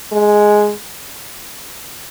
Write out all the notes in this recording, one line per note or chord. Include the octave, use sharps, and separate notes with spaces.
G#3